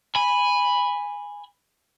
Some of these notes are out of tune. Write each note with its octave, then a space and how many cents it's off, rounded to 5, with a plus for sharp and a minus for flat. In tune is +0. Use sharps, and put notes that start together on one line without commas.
G#5 -10 B5 +0